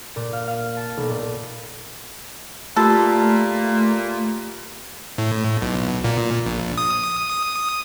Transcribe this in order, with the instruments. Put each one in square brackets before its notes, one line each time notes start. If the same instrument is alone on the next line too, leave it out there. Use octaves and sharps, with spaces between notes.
[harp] A#2
F5
F5
A5
B1
A#2
[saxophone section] A#2 [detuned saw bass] A3 [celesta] F4 G4 B5 [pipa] A4
[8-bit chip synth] A2
B1
A#2
A#1
D#6